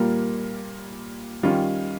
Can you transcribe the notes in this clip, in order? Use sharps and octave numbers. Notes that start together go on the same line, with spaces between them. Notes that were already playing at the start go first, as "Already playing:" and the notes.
Already playing: A#2 G3 A#3 F4 A#4
D#3 G3 C#4 F4